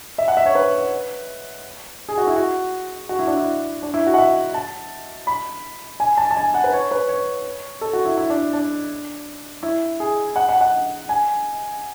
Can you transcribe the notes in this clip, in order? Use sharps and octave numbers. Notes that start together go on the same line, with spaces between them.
E5
F#5
E5
C#5
B4
G#4
F#4
E4
F#4
F#4
E4
D4
E4
D4
E4
F#4
F#5
E5
A5
B5
G#5
A5
A5
G#5
F#5
B4
C#5
B4
C#5
A4
F#4
E4
E4
D4
D4
E4
G#4
F#5
F#5
F#5
G#5